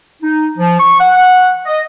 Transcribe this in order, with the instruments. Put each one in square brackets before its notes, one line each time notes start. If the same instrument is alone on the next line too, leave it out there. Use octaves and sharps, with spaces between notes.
[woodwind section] D#4
F3
C#6
F#5
D#5